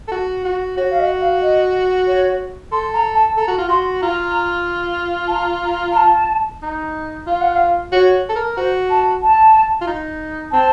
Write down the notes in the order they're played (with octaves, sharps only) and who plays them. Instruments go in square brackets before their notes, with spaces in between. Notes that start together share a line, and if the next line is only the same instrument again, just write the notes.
[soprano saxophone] A4
F#4
F#4
[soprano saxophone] F#4 [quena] C#5
[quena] F5
D#5
F5
D#5
C#5
[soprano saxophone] A4 [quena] C6
[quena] A#5
A5
[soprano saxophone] A4 [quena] A#5
[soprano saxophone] F#4
F4
[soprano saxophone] F#4 [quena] C6
[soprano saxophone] F4 [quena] A#5
[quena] A5
A#5
A#5
A#5
A5
[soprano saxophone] D#4
[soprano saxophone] F4 [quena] F5
[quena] F#5
F5
[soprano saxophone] F#4 [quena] C#5
[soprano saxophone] A4
A#4
[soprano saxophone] F#4 [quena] C5
[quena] A5
A5
[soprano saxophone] F4
D#4
[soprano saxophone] C4 [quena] A5